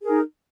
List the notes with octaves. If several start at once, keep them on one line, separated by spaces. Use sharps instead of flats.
D#4 G#4 A#4